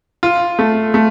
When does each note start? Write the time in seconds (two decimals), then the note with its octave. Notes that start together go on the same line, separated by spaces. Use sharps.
0.23 F4
0.59 A3
0.94 A3